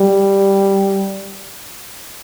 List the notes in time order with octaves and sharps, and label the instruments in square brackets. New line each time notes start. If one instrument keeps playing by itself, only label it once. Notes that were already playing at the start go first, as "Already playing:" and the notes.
Already playing: [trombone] G3